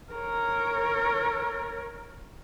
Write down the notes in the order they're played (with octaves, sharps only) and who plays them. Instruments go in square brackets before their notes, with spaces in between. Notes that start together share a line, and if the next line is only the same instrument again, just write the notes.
[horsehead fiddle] A#4 C#5